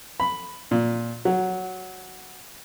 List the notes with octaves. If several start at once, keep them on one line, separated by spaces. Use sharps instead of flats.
B5
A#2
F#3